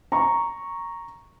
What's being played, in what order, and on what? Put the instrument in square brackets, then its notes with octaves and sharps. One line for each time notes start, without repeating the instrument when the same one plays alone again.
[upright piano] A#5 C#6